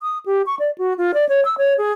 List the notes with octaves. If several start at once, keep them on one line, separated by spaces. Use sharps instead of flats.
D#6
G4
C#6
D5
F#4
F4
D5
C#5
E6
C#5
G#4